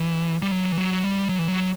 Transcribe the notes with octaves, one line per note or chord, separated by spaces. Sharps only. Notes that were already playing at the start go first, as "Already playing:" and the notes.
Already playing: E3
G3
F#3
E3
F#3
G3
F#3
E3
F#3